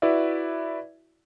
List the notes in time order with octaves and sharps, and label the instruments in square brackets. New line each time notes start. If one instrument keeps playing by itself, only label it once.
[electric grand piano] E4 F#4 B4 D5 E5